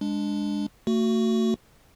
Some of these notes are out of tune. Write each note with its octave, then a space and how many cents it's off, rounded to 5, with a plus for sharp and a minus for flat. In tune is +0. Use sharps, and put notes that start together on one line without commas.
G#3 -15 D4 -5
A3 +40 F#4 +0